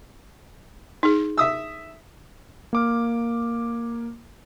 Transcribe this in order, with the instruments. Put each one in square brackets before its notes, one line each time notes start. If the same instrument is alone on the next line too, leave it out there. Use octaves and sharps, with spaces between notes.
[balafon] D#4 G#4
[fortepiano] E5 D#6 E6
[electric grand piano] A#3 D6 F6